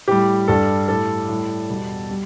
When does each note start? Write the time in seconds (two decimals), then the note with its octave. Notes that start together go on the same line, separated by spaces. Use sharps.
0.08 A2 G3 G4
0.48 G2 G3 A4
0.88 A2 G3 A4
1.29 A2 G3
1.69 E2 B2 G3
2.10 G3